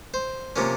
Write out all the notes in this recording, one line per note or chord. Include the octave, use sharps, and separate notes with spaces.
C5
C3 F3 A#3 C#4